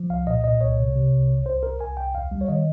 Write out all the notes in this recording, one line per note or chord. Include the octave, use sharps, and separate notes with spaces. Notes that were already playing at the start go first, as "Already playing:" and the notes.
Already playing: F3
C2 F5
A#2 D#5
A#2 D#5
C2 C#5
C3
C3
C2
C2
C2 C5
C2 A#4
C2 G#5
C2 G5
D#2 F5
G3
C#5
D#3 D#5